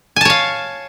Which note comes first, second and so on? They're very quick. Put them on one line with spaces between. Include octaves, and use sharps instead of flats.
G#5 A5 C#5 F5